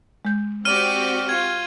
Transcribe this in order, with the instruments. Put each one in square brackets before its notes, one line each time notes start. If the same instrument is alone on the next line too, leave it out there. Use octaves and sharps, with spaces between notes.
[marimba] G#3 G6
[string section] C4 F#4 G4 [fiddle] D5 [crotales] F6 D#7
[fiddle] F4 [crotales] G#6